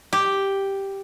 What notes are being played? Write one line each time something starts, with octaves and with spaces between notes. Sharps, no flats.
G4